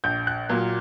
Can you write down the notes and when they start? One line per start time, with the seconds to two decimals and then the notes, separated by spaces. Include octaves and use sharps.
0.04 A#1 G6
0.27 F#6
0.49 A#2 F#3 A#3